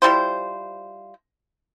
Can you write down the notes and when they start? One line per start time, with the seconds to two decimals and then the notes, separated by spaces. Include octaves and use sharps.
0.02 F3 G3 E4 C5